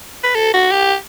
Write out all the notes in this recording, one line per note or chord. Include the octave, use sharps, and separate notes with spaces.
B4
A4
F#4
G4